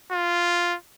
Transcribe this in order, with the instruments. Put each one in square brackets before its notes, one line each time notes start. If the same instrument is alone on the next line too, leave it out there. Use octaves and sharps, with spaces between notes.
[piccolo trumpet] F4